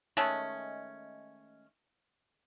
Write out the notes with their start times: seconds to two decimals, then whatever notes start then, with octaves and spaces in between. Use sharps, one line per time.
0.17 D#3 G#3 A3 C#4